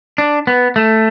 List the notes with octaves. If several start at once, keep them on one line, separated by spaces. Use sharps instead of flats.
D4
B3
A3